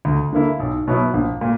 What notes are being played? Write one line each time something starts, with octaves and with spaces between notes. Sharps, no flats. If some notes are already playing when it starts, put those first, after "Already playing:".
D2
D3 A#3 E4
B1
B2 F#3 B3 E4
A#1
A#2